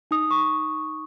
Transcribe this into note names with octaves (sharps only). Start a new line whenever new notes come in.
D#4 D#6
C#6